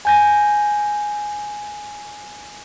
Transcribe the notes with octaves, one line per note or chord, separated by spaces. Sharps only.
G#5 G6 A#6